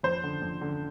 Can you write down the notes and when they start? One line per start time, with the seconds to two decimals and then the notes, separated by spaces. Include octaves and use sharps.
0.03 F2 C5
0.23 D3
0.42 F2
0.61 D3